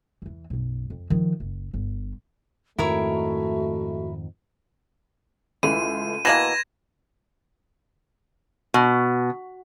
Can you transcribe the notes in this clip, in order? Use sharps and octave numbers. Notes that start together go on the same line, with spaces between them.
E2 E3
B1 F#2
F2
D#3 F3
F#1
G1
F2 G#2 D#3 A3 E4 F#4 A#4 C#5
C#2 E3 A3 C6 D#7
B2 E3 A#3 B4 C6 G#6 A#6 E7
B2